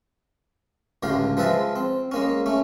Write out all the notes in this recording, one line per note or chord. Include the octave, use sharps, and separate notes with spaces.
C#2 A2 D3 G4 F5
F3 G#3 B4 E5 F5 A5
C4
G#3 A#3 C#4
A3 C#4